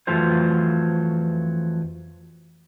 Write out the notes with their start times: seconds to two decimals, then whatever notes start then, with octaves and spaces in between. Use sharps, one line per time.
0.07 F2 E3 F#3 A3 F4 C5